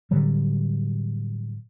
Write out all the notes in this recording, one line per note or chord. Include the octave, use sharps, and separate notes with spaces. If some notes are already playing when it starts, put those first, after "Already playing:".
A2 D3 F#3 G3